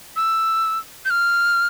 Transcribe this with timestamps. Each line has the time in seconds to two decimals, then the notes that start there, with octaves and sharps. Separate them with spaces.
0.16 E6
1.05 G6
1.10 F6